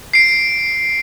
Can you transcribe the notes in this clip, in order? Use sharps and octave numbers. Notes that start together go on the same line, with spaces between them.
C7 D7